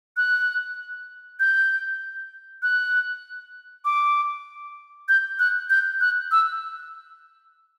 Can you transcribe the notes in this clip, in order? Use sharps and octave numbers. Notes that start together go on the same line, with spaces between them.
F#6
G6
F#6
D6
G6
F#6
G6
F#6
E6